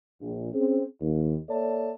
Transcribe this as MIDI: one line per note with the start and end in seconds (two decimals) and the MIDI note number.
0.21 0.50 34
0.53 0.83 60
0.53 0.83 61
0.53 0.83 68
1.01 1.36 39
1.49 1.92 58
1.49 1.92 69
1.49 1.92 73
1.49 1.92 74
1.49 1.92 76
1.49 1.92 81